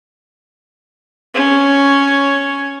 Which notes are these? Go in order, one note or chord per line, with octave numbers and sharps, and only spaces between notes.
C#4 C#5